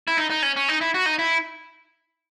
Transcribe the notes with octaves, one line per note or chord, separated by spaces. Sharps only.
E4
D#4
D#4
C#4
C#4
D#4
E4
F#4
D#4
E4